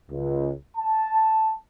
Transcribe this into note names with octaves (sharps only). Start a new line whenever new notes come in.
C#2
A5